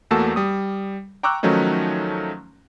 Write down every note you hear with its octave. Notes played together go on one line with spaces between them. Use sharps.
E2 A3 A#3 F#4 A5 E6
G3 D#6
G5 A#5 C#6 D6 E6 F#6
D#3 F3 F#3 A3 C#4 D#4